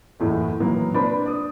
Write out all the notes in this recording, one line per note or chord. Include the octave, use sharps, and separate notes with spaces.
F#1 E2 A2 E3
A#2 D#3 E3 F#3 A#3 B3
C3 D4 B4 C5 B5
D5 D#6